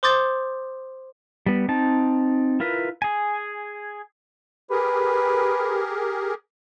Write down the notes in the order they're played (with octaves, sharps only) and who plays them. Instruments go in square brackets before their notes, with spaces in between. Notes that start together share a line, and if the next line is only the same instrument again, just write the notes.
[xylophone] C5 C6 D6 D#6 G6 A6
[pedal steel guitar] G3 B3
C4 D#4 A5
E4 F4 A#4 B4
G#4 G#5
[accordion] G4 G#4 A#4 [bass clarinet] B4